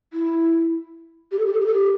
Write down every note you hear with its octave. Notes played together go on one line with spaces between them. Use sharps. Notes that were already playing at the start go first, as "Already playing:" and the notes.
E4
G4
A4
G4
A4
G4
A4
G4